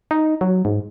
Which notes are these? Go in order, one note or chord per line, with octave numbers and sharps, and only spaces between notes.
D#4
F#3
G#2